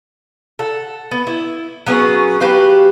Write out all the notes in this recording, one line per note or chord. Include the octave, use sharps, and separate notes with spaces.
A4 F#5
B3
E4
F#3 B3 C#4 G#4
F#4 G4 B4 F5